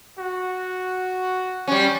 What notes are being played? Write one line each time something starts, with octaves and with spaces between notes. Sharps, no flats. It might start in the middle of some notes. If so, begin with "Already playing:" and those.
F#4
G3 C#4